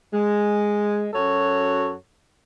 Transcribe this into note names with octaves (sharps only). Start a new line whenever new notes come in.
G#3
F#2 F#4 A4 C#5